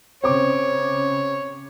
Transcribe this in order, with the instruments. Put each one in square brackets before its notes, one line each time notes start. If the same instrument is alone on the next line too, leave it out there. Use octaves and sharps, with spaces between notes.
[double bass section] C#3 [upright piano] C4 D6 [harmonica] C#5